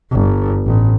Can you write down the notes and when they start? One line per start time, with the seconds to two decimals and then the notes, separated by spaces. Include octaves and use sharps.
0.12 G1
0.66 A1